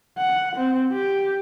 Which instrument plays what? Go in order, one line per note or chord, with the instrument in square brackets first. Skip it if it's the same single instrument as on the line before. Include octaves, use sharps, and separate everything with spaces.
[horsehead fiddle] F#5
C4
G4